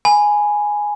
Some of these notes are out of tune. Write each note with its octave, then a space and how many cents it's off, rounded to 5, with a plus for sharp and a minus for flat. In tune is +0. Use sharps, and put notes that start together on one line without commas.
G#5 +0 B5 +0